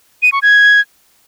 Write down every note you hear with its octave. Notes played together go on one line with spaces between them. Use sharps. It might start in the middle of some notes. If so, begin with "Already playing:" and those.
D#7
C#6
G#6